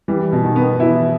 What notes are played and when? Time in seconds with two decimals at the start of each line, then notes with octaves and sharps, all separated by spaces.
0.08 E3 G3
0.32 B2
0.44 D#3
0.56 B3
0.80 E3 E4